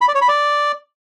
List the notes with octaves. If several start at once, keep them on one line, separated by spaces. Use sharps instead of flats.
B5
D5
C#5
B5
D5